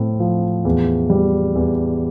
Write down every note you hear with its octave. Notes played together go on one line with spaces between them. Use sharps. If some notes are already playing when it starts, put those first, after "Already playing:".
Already playing: A2 C4
F3
E2
G3
E2